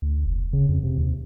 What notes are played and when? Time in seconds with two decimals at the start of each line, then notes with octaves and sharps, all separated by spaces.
0.02 D2
0.26 F1
0.53 C#3
0.69 F2
0.83 C3
0.98 D#2